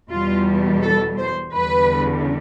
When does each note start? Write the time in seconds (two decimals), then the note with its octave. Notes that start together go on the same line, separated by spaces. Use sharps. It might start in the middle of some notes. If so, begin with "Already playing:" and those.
0.11 E2 B2 G3 F4
0.82 A4
1.18 C5
1.53 E2 D3 G3 B4